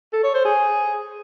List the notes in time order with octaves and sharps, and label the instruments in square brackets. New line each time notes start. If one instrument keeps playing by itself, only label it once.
[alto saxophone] A4
C#5
C5
G#4